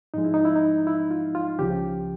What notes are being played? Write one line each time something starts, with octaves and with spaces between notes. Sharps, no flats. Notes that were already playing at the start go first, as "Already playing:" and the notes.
G#2 F3 G#3 D#4
E4
D#4
E4
D#4
E4
F4
F4
C#2 C#3 F3 G4